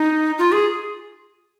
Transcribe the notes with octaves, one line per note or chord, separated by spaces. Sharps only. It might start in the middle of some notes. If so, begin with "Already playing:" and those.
Already playing: D#4
F4
G#4